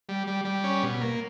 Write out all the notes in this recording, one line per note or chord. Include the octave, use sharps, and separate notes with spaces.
G3
G3
G3
C#4
B2
A#3